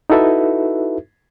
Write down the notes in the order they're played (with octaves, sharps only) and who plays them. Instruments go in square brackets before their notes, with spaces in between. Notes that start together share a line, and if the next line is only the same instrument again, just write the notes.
[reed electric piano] D#4 E4 F#4 A4 B4 E5